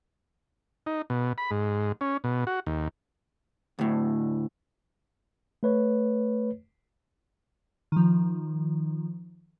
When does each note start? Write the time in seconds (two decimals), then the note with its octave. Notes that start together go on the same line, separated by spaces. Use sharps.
0.86 D#4
1.10 B2
1.38 B5
1.51 G#2
2.01 C#4
2.24 B2
2.47 F#4
2.67 D#2
3.79 D2 A2
5.63 A3 B4 C#5
7.92 D#3 F3